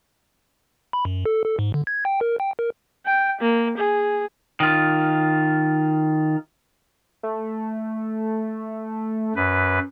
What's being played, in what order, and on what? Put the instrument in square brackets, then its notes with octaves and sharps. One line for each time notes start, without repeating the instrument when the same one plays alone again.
[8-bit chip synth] B5
F#2
A4
A4
G#2
D3
G#6
G5
A#4
G5
A#4
[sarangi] G5
A#3
G#4
[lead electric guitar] D#3 F4
[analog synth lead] A3
[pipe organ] F#2 B4